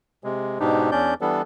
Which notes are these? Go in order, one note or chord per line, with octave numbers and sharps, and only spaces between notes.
C3 G#3
G#2 B2 D4 D#4 G4
E2 C#4 D4 D5 G6
E3 G3 B3 D4 A4